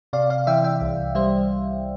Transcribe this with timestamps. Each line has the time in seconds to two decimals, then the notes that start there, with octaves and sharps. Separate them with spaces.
0.13 C3 D5 F5
0.30 D5 F5
0.47 E3 E5 G5
0.64 E5 G5
0.81 C2
1.15 G3 C5 E5